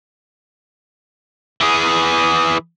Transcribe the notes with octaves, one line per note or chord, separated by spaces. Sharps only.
E3 G#4